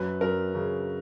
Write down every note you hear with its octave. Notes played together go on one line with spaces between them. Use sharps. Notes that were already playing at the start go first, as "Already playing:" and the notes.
Already playing: F#2 B4
F#2 A#4
C#3